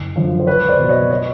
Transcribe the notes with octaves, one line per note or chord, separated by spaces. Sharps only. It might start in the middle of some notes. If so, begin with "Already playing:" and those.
Already playing: F#1
F#2 D3 F3
C5
C#2 B4 C#5
C5 D5
B2 F#3
C#5 D#5
C#5 D#5